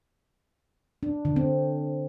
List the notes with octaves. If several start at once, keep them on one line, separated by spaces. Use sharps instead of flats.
D4
D3
C4